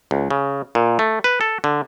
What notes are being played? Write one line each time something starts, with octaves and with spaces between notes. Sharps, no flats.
C#2
C#3
A#2
A3
B4
A4
D3